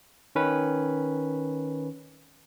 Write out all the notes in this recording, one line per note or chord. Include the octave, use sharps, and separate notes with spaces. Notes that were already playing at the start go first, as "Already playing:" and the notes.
D#3 C#4 B4